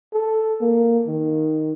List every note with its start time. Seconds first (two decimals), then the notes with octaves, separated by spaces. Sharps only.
0.13 A4
0.61 A#3
1.06 D#3